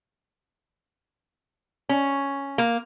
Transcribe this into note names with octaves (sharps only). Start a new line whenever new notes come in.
C#4
A#3